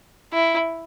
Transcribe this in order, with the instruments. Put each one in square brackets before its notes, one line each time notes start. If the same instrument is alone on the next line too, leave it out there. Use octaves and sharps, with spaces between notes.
[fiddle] E4